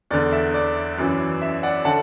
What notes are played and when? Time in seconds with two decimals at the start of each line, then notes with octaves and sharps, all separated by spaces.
0.11 E2 D3 D5
0.32 E5
0.54 D5
0.98 F#2 E3
1.42 E5
1.63 D5 F#5
1.85 D3 F#5 A5